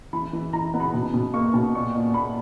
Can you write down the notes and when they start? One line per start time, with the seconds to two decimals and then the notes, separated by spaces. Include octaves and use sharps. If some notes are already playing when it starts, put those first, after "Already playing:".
0.13 E3 B5
0.33 E3
0.53 E3 A#5
0.74 B3
0.80 B5
0.93 B2
1.14 B2
1.34 A#3 C#6
1.54 B2
1.75 A#2 C#6
1.95 A#2
2.14 A#2 B5